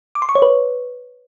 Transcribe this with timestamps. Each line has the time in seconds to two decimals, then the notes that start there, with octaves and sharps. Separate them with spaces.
0.15 D6
0.22 C6
0.29 C#6
0.35 C#5
0.42 B4